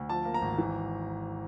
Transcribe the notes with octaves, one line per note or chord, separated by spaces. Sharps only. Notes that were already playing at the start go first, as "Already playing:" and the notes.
Already playing: D2
F3 A5
A#3
A#5
G#1
E3